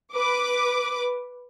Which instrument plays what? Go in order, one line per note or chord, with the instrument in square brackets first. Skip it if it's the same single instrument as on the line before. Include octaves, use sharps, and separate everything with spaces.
[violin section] B4 D6